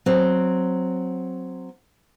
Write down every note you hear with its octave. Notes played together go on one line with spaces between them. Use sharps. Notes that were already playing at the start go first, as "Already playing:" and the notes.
F#3 C4